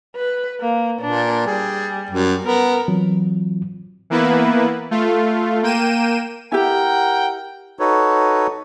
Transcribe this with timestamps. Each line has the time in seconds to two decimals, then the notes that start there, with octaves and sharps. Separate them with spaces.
0.16 B4
0.60 A#3
1.01 A#2 D4
1.46 G3 G#4
2.11 F#2
2.45 B3 A#4
2.88 E3 F#3 C4 F4
4.10 E3 A#3 B3 E4 B4
4.91 A3 F4
5.63 A#3 G5 D#7 E7
6.52 E4 G4 A#4 F#5 G5
7.79 D#4 F#4 A4 B4 C#5